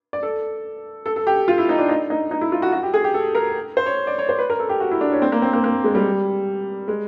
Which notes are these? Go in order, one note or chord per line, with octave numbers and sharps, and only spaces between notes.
D5
A4
A4
A4
G4
F4
E4
D#4
D4
D#4
D#4
D#4
E4
F4
F#4
F#4
G4
G#4
G4
A4
A#4
C5
C#5
D5
C#5
C5
B4
A#4
A4
G4
F#4
E4
D4
C#4
C4
A#3
C4
A#3
A#3
G#3
G3
G#3